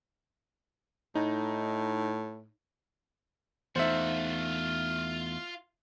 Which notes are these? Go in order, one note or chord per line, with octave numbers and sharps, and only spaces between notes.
A2 D#4
E2 A3 D#4 F4 C5 E5 F#5